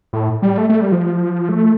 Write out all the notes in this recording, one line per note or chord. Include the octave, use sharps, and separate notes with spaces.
A2
G3
A3
A3
G3
F3
A3